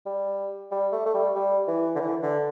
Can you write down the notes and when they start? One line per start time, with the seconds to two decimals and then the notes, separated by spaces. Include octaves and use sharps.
0.06 G3
0.71 G3
0.92 A3
1.06 A3
1.14 G3
1.35 G3
1.68 E3
1.95 D3
2.00 E3
2.22 D3